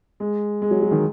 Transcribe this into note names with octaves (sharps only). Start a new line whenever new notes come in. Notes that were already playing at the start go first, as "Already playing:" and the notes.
G#3
G#3
F#3
F#3
D#3